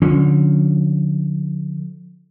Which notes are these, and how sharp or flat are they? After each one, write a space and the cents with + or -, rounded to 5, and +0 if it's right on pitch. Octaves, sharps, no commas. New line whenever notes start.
D3 +0 F3 +40 C#4 +0